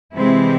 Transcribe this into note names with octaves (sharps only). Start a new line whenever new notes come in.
C3 E3 G#3 C4 E4